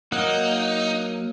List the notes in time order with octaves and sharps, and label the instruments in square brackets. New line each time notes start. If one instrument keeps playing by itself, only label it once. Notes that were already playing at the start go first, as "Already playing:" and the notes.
[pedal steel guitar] F#3 A#3 F#5 [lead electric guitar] D#4